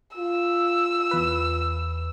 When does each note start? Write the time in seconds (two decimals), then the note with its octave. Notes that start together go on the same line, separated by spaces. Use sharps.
0.17 F4 E6
1.11 E2 B4